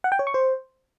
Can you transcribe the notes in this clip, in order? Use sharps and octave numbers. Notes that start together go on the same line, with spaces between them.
F#5
G5
C#5
C#6
C5